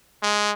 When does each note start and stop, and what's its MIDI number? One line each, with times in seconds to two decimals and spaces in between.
0.22 0.54 56